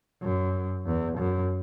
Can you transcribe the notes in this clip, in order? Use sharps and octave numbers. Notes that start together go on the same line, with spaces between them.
F#2
E2
F#2